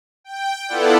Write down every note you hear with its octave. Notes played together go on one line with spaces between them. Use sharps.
G5
B3 E4 F4 A4 D5 F#5